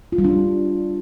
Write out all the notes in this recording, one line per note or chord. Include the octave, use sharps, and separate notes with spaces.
F4
G3
D4